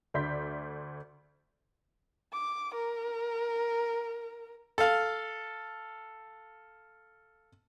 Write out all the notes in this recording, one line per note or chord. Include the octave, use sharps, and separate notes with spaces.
D2 D5 E5 C6 G6 B6
D6
A#4
A4 F5